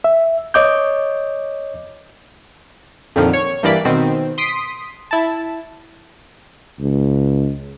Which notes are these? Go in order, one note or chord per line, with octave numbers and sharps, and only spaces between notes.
E5
C#5 D#5 D6 G6
F2 A#2 D3 D#3 F3
C#5
G2 E3 A#3 D5 B6
B2 D#3 C4
C6 D#6 B6 D7
E4 A5
C#2